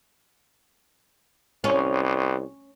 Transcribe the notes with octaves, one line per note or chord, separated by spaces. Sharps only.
C2 C#4